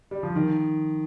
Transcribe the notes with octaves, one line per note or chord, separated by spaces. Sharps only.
G3
F3
D#3